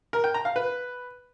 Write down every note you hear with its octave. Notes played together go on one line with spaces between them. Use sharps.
A#4
G5
A#5
F5
B4